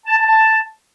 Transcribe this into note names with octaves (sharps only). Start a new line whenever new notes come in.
A5
A5
A5